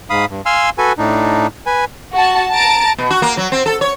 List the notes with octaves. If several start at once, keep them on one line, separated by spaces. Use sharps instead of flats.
G#2 F5 B5 D#6
G2
F5 G#5 C6 E6 F6
F#4 A4 B4 G#5
A2 D4 D#4
B4 G#5
F#4 A5
A5 A#5 A6 D7
B2
F#4
A#3
F#3
C4
A4
C#5